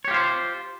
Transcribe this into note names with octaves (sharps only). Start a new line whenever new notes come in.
F4 G4 C5 C#5